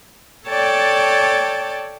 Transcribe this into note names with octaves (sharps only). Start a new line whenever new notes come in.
A4 C#5 D5 G5 A5